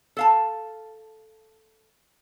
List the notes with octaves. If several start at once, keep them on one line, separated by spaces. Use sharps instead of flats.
A4 F5 A5